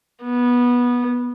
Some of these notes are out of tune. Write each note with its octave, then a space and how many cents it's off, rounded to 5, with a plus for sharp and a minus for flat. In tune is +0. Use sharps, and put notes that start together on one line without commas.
B3 -15